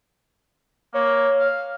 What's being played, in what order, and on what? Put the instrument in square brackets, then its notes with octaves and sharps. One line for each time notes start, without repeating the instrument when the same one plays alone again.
[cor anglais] A#3 [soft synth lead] C#5
[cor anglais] F5